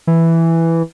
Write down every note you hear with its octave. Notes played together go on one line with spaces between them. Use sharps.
E3